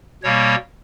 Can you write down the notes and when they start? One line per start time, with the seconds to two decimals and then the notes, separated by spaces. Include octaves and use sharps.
0.23 B2 G3 A#3 C#5